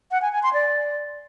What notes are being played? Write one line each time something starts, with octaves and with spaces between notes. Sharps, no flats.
F#5
G#5
G#5
C6
D5